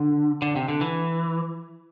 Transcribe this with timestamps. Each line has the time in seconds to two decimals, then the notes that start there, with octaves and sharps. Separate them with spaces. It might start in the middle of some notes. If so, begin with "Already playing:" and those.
Already playing: D3
0.42 D3
0.56 C3
0.68 D3
0.81 E3